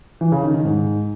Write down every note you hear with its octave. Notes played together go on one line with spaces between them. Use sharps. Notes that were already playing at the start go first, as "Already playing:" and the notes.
E3
C#3
D#3
D#3
G#2